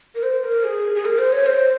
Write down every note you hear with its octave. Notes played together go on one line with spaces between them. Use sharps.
A#4
C5
A#4
G#4
G#4
A#4
C5
C#5
C5